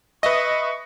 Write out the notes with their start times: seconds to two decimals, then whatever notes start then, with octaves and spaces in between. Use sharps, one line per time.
0.23 B4 D#5 E5 C#6 A#6